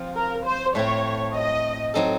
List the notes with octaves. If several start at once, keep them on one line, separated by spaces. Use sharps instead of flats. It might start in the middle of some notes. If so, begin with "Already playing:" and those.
Already playing: F3 C4 F4
A#4
C5
A2 A3 C4 C#5
D#5
F#3 C4 D#4 A4